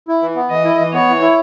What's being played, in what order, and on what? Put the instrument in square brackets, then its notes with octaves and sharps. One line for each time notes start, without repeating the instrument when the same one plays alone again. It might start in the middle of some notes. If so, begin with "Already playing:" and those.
[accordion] E4
E3
B3
[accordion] E3 [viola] D#5
[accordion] E4
E3
[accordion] B3 [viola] C#5
[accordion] E3
E4